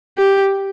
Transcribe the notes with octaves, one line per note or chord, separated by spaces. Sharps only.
G4